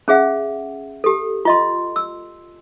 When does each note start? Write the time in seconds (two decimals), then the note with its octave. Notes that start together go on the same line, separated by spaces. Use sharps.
0.08 C#4 G#4 E5 F#5
1.04 G4 A4
1.45 F4 D#5 C6
1.96 E6